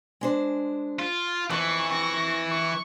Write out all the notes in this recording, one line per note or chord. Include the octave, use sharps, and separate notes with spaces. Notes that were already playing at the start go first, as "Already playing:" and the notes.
G#3 D4 C5
F4
F2 E3 C#6
C#6 A#6
C#6